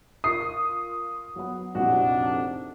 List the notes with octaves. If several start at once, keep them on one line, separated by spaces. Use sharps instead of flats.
F4 A#4 C#6 D#6 C7
F#3 B3
A#1 F2 A2 C3 D4 D#4 F#4